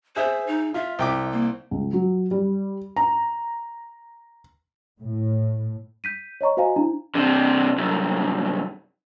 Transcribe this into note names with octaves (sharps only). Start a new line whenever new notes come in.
G#4 C5 E5
D#4
F4 E5
C2 E5 G5 D6
A#3
C#2
F#3
G3
A#5
A2
G6 B6 D#7
C#5 D#5 A#5 C#6
F#4 C5 D#5 F5 G#5 A#5
D4 E4 A#5
C3 D4
C2 F#2